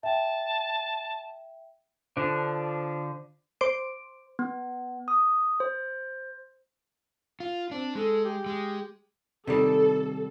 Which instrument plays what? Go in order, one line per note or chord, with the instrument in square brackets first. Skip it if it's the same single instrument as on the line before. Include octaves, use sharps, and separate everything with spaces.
[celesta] E5 G5 [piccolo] A5
[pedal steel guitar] D3 D4 [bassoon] F3
[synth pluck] C5 C6 D6 D7
[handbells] B3
D#6
C5
[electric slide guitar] F4
[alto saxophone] C4 [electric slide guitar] D4
[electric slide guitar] G#3 [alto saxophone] A4
[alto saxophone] G4
[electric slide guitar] G#3
[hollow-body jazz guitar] C3 D#3 G3 [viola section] A4